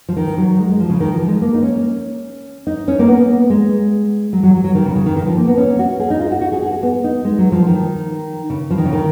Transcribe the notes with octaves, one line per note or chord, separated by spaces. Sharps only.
F3
D#3
F#3
G#3
G#3
F3
C#3
D#3
F3
G#3
A#3
D#4
C#4
D#4
C#4
A#3
B3
G#3
F#3
F#3
F#3
F#3
D#3
C#3
C#3
D#3
D#3
F3
A#3
B3
C#4
F#4
G#4
D#4
F4
F#4
F#4
G#4
G#4
F#4
B3
D#4
G#3
F#3
F3
D#3
C#3
F3
D#3
C#3
D#3